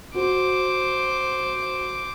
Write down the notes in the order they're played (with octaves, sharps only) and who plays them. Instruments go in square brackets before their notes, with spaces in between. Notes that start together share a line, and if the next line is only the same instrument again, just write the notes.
[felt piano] F#4 [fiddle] C5 D6